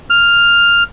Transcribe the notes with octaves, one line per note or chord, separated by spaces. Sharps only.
F6